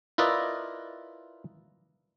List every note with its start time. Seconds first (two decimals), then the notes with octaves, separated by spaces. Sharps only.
0.18 E4 F4 A#4 B4 D5 D#5